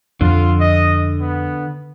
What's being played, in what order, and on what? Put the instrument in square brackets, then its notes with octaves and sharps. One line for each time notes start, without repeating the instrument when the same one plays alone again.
[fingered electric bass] F2 F3 [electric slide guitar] D3 [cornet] F4
[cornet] D#5
B3